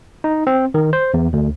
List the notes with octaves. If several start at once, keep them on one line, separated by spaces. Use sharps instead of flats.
D#4
C4
D#3
C5
E2
D2